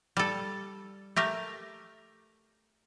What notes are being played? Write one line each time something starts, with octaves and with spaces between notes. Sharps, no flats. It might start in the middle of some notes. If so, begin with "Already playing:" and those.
G3 A4
A3 G4 A#4